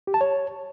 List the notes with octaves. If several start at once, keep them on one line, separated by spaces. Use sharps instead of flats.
G4
A5
C#5